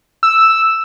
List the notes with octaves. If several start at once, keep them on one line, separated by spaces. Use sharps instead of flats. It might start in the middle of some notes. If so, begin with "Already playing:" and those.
E6